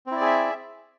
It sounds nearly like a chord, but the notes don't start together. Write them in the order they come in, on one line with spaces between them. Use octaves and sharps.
C4 E4 D5 G#4 E5